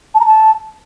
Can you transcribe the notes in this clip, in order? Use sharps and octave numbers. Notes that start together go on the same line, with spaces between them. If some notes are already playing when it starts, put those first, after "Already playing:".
A5
A#5
A5